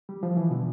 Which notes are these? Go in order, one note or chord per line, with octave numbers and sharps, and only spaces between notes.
G3
F3
E3
B2 D3